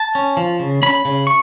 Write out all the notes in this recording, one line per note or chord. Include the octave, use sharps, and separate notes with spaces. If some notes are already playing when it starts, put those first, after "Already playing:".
Already playing: A5
C#4
F3
C#3
C#4 B5
C#3
C#6